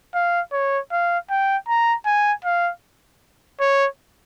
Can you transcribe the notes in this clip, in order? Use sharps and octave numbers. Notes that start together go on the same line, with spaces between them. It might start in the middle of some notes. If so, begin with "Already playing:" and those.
F5
C#5
F5
G5
A#5
G#5
F5
C#5